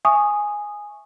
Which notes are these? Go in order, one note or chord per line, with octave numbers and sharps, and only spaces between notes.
E5 G#5 C#6 D#6